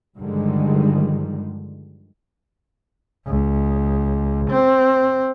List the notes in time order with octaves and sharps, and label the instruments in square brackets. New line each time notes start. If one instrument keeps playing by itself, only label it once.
[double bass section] G2 D3 D#3 F3 G3 G#3
[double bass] C#2
C4